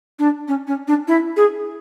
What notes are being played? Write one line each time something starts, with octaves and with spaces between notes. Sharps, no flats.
D4
C#4
C#4
D4
E4
G#4